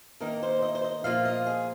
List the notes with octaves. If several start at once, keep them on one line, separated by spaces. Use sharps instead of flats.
D#3 A#3 D#4 A#4
C5
D#5
C5
D#5
A#2 F3 A#3 F4 F5
D#5
G#4